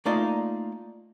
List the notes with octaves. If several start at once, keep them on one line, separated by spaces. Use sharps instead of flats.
A3 A#3 D#4 F4 D5 D#5